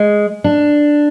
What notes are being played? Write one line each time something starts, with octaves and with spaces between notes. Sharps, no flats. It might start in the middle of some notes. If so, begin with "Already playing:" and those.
Already playing: G#3
D4